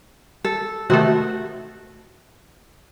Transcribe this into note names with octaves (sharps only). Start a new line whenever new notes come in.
A4
C3 D#3 A3 F#4